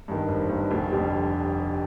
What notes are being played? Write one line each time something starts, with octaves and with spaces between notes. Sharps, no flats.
G2 D#3
G#1
G2 D#3
F1
F2 D3 G3